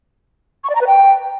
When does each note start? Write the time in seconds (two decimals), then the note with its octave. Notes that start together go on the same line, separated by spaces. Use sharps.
0.63 C#6
0.69 D5
0.75 A#5
0.81 B4
0.86 G5